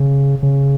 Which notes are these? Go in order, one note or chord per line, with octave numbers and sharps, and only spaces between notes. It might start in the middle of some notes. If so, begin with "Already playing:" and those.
Already playing: C#3
C#3